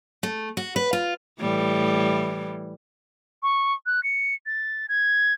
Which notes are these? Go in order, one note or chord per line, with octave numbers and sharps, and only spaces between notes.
A3
F#4
B4
F4
A2 E3 G3
C#6
F#6
C#7
A6
G#6